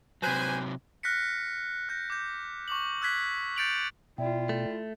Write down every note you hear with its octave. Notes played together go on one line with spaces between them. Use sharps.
C3 F#3 B4 C5 G#5
F6 F#6 A#6 B6 C#7
F#6 G6 A#6
D6 G6
C#6 D6 F#7
E6 F#6 G#6 B6
G6 A6 C#7 D7 F7 F#7
B2 E4 F4 D5 E5 G5
A3